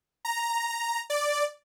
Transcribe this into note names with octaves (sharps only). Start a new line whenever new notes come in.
A#5
D5